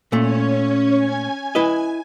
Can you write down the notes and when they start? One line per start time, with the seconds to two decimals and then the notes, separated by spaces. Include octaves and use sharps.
0.12 A#2 A3 C#4 C#5
0.97 G#5 G#6
1.55 E4 B4 D#5